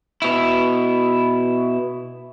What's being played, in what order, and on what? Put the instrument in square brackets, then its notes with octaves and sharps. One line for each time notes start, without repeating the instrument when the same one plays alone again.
[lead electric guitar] B2 E4